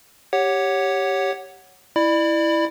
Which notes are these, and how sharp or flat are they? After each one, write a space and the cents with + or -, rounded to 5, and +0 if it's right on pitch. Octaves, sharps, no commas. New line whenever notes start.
G4 +0 C#5 +0 F#5 +0
E4 +0 D5 +30 B5 +0